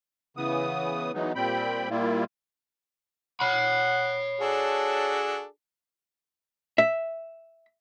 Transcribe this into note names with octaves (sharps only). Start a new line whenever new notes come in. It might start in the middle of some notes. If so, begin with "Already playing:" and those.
C#3 E3 B3 D#6
E3 F#3 G#3 B3 D#4
A#2 G3 C4 G5 B5
A#2 G3 A#3 E4 F4
C#5 F#5 B5
D4 F#4 G#4 A4
E5